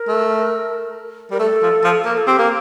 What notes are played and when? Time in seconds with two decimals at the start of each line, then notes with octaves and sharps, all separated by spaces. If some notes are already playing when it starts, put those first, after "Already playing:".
Already playing: A#4
0.08 A3
1.31 G3 A#4
1.39 A3 A4
1.62 F3
1.84 F3
2.05 A#3 A#4
2.17 A4
2.27 C4 G4
2.39 A#3